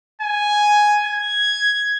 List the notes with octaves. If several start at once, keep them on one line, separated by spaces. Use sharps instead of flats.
G#5
G#6